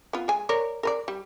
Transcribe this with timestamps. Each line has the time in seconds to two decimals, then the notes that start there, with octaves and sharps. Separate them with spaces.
0.13 B3 F4
0.28 G#3 G#5
0.49 A#4 C#5 D5
0.83 A#4 B4 D5
1.08 G3